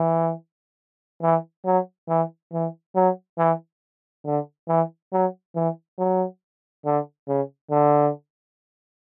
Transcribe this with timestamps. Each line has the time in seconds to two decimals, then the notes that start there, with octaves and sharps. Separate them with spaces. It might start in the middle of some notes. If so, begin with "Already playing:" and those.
Already playing: E3
1.23 E3
1.65 F#3
2.09 E3
2.53 E3
2.96 F#3
3.38 E3
4.25 D3
4.68 E3
5.13 F#3
5.56 E3
5.98 F#3
6.86 D3
7.28 C#3
7.71 D3